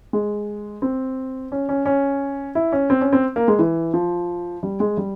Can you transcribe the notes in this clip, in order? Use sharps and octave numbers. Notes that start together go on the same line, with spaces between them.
G#3
C4
C#4
C#4
C#4
E4
C#4
C4
C#4
C4
A#3
G#3
E3
F3
G3
G#3
G3